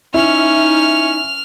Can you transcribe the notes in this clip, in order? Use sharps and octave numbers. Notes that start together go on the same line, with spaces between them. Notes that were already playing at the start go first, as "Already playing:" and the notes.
C#4 D#4 E4 F6 F7